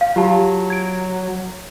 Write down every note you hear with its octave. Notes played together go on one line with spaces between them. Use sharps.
F5
F#3 F4 G4 A5
G#6 D7